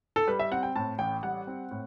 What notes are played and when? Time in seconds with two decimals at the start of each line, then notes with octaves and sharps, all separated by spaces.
0.16 A4
0.27 G3 B4
0.39 E5
0.51 C4 F#5
0.63 G5
0.75 A2 A5
0.99 A1 G5
1.23 G3 F#5
1.47 C4
1.71 A2